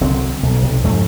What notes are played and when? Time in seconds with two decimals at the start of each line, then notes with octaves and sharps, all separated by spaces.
0.01 C2 D3 F#3 C4
0.43 B1
0.63 B1 C3
0.84 F2 G#2 A3